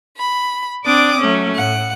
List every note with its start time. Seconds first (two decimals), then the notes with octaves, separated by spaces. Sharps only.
0.16 B5
0.85 C4 D4 D5 D6 D#6
1.20 F#3 A3 C#4
1.56 A2 F#5